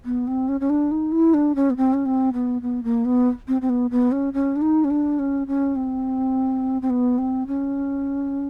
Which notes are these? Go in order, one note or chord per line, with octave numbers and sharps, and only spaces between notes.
B3
C4
C#4
C#4
D4
D#4
E4
D4
C#4
B3
C4
C#4
C4
B3
B3
A#3
B3
C4
C4
B3
B3
C#4
C#4
D4
D#4
C#4
D4
C#4
C#4
C4
C4
B3
C4
C#4